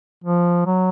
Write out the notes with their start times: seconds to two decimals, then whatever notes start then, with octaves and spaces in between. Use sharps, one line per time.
0.23 F3
0.66 F#3